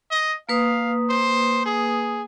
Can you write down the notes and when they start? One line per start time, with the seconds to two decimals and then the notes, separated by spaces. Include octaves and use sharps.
0.11 D#5
0.49 A#3 B4 F5 D#6
1.10 C5
1.66 G#4